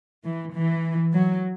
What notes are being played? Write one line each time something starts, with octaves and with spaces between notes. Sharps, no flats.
E3
E3
F#3